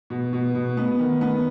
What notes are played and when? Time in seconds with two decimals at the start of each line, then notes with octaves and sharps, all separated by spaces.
0.10 B2
0.33 B2
0.55 B2
0.77 B3
0.99 D#3
1.21 B3